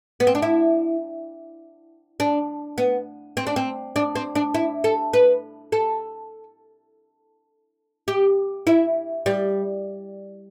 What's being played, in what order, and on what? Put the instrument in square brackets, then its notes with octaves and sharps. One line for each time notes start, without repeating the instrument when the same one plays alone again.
[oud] B3
C4
D4
E4
D4
B3
C4
D4
C4
D4
C4
D4
E4
A4
B4
A4
G4
E4
G3